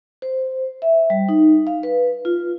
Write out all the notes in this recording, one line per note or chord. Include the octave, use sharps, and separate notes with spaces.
C5
E5
G3
D#4
F5
B4
F4